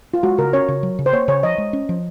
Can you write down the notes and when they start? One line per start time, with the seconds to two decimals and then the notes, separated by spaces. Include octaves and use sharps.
0.14 F4
0.23 G#3 F#4
0.38 C#3 A#4
0.53 C#4 C#5
0.68 C#3
0.83 F#3
0.99 C#3
1.06 C5
1.13 A#3 C#5
1.28 C#3 C#5
1.43 F3 D#5
1.58 G#3
1.73 C#4
1.89 F3